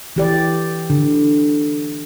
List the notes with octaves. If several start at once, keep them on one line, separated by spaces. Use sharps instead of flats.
E3 G4 D5
D3